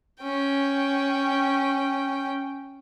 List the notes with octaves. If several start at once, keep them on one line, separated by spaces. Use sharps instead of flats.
C#4 G5